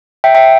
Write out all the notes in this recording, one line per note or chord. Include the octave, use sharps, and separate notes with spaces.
E5 G5
E5 G5